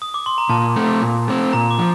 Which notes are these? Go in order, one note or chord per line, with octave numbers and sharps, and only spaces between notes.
D#6
D6
C6
A#5
A#2 A5
A3 C4
A#2
A3 C4
A#2 A#5
D6
F3